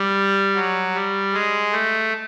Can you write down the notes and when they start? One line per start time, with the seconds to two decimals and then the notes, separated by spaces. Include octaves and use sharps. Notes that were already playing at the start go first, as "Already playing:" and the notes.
Already playing: G3
0.55 F#3
0.94 G3
1.33 G#3
1.72 A3